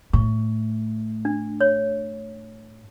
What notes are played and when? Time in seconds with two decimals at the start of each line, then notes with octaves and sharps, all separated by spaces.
0.13 A2 C#6
1.25 D4
1.61 C#5